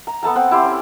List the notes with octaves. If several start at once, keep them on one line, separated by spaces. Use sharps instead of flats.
A#5
B3 A4 A5 A#5
C4 F#5
E4 G4 C6
C#4